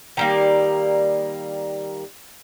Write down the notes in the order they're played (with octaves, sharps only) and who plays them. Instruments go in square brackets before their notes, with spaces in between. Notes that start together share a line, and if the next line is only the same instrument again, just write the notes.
[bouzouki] D#3 G3 A#3